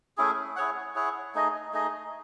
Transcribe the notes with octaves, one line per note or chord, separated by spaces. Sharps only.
A3 C#4 E4 G#4
E4 G#4 C#5 F#5
E4 G#4 C#5 F#5
A3 D#4 G#4 D#5
A3 D#4 G#4 D#5